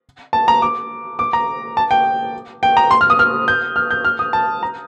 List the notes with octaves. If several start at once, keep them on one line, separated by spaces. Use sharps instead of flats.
A5
A#5
D6
D6
A#5
A5
G5
G5
A#5
C6
F6
D#6
F6
G6
F6
G6
F6
D#6
A5
A#5